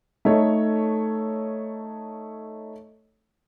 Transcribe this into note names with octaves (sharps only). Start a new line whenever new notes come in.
A3 D#4 A4 C#5